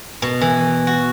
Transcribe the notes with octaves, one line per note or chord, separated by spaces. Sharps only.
B2
E3
F#4